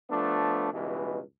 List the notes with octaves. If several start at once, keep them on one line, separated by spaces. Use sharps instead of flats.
F3 A3 B3 D4
C#2 G2 B2 E3